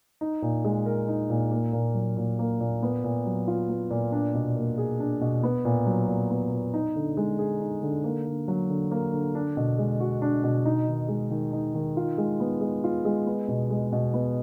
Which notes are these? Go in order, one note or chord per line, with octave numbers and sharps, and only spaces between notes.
D#4
A#2
G#3
A#4
D#4
A#2
A#3
A#2
F#3
A#2
A#3
A#2
B3
A#2
F#3
F4
B3
A#2
D4
B2
A#3
G#4
D4
B2
B3
A#2
F#3
A#2
B3
A#2
D#4
D3
G#3
G#4
D#4
D3
A#3
D3
F#3
D3
A#3
D3
D4
B2
G#3
F#4
D4
B2
D#4
D#3
G#3
D#3
D#4
D#3
F4
G#3
B3
G#3
F4
G#3
B3
B2
G#3
B2
B3